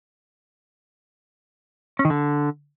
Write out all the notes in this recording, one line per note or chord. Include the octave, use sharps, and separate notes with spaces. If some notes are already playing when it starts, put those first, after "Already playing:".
C#4
D#3
D3